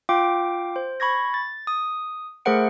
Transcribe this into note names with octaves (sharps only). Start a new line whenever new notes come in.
F4 F5 G5 D6
C5
B5 C#6 G#6 A#6
A6
D#6
A3 G#4 A#4 C5 F#5 D7